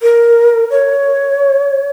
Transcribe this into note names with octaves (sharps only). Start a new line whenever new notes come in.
A#4
C#5